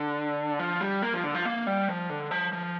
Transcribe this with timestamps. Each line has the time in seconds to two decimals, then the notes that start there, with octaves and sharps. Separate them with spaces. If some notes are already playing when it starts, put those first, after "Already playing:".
Already playing: D3
0.59 F3
0.81 G3
1.02 A#3
1.14 F3
1.23 D3
1.35 F3
1.45 A#3
1.67 G3
1.89 F3
2.10 D3
2.31 F3
2.53 F3